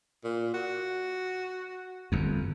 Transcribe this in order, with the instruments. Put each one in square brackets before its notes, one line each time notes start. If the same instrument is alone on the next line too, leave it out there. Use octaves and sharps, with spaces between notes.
[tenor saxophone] A#2
F#4
[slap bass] G1 F2